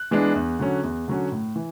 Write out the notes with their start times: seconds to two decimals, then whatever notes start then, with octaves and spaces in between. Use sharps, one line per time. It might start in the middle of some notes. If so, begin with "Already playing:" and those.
Already playing: F#6
0.11 E3 G#3 B3 D4
0.35 E2
0.59 D3 F#3 C#4
0.83 E2
1.08 D3 F#3 C#4
1.32 A2
1.56 E3